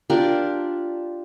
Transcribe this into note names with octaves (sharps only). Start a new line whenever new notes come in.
D4 F4 G4 A#4